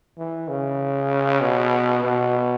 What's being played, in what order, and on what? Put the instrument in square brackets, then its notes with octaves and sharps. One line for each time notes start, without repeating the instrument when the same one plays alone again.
[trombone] E3
C#3
B2
B2